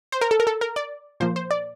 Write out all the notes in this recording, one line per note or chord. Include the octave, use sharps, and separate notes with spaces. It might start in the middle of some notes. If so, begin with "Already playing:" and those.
C5
A#4
A4
A#4
A4
A#4
D5
A#2 F3 A#3 C5
C5
D5